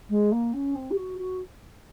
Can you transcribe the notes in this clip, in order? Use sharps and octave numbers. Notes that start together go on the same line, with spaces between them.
G#3
A#3
C#4
C4
G4
F#4
F#4